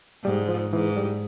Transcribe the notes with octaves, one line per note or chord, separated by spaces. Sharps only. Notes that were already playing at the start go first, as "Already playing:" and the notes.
G#2 G3
F3
G#2 E3
G3